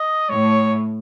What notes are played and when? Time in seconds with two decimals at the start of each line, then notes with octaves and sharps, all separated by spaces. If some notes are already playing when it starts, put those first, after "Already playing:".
Already playing: D#5
0.29 A2 C#5